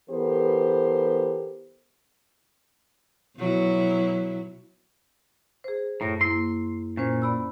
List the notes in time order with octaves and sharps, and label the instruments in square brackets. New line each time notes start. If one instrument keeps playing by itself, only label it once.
[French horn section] E3 B3 G4 A4 A#4 C5
[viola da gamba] B2 F#3 E4
[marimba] G#4 C5
[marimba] F#2 A#6 [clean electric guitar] A2
[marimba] A#3 E4 [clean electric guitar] C6
[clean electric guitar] A#2 [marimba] C#4 C5
[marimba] D5 B5 E6